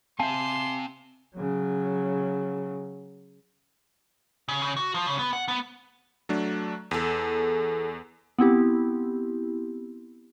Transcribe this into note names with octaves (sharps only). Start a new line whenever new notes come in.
C4 E5 F5 G#5 A5 C6
C#3 F#3
C#3
C#3
F#4
F3
C#3
B3
F#5
B3
F#3 A3 D4
E2 G#4 A4
B3 C4 E4 G4